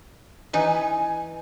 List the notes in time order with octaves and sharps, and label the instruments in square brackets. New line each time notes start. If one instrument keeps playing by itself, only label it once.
[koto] E3 D#4 B4 [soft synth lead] G#5